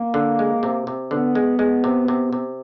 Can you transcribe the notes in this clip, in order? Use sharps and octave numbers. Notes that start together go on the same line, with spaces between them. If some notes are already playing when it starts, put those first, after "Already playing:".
Already playing: A#3
D3
G#3
C3
C3
D3 B3
G#3
G#3
C3
C3
C3